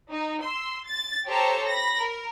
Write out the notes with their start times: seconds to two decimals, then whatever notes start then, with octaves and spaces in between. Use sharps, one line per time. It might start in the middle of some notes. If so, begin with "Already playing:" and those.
0.11 D#4
0.43 C6 E6
0.85 A6
1.27 G4 A4 C5 C#5 A5 A#5
1.66 B5 A#6
1.98 A#4